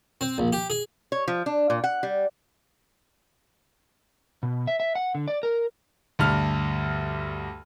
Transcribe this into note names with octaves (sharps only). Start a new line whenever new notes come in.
C4
A#1
G4
G#4
C#5
F3
D4
A#2
F#5
G3
B2
E5
E5
F#5
D3
D5
A#4
D2 G2 F6